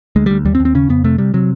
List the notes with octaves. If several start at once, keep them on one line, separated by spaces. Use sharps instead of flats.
D2 G#3
D2 G3
D#2 G3
C4
D#2
C4
C#3 C#4
F2 B3
C3 A3
C3 G3
C3 F#3